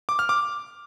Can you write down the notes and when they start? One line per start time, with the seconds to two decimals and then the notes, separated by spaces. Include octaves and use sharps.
0.09 D6
0.19 F6
0.29 D6